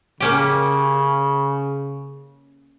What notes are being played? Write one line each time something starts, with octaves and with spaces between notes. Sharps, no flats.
C#3 A#3 C#4 G4